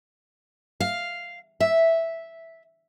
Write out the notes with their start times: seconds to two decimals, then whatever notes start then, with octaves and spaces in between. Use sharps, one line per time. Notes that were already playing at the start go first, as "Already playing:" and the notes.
0.80 F5
1.60 E5